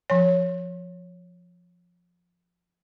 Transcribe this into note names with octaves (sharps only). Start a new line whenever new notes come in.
F3 C#5